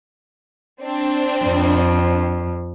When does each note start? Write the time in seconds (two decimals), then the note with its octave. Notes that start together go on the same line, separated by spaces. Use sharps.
0.81 C4 D4
1.45 F2